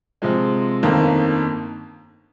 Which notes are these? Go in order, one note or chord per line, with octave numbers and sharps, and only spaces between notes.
C3 F3 G#3
G1 F2 D#3 A#3